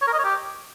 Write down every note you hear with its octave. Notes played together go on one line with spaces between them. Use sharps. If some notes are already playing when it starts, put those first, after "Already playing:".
C#5
A#4
D#5
C#5
G4